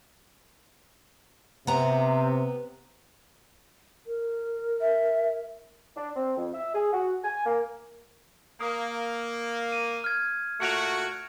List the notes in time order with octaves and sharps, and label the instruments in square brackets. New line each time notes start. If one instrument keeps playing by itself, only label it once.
[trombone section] C3 [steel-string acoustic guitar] B3 A#5
[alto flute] A#4
[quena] E5
[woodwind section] D4
C4
F2
E5
G#4
F#4
G#5
A#3
[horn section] A#3 [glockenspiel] D#6
[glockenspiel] D#7
F6 G#6
[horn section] A#2 A3 F#4 [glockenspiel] C#7 D7 F7